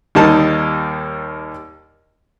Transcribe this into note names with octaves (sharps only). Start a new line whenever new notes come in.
D#2 G3 A#3 D#4 A5